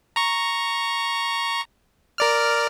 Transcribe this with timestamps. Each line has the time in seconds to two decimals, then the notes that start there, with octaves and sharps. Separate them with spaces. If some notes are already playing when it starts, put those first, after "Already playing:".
0.16 A#5 C#6
2.18 A#4 D5 F6